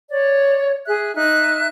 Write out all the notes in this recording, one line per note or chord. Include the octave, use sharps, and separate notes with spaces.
C#5 D5
G#4 E5 F#6
D#4 E5 F#6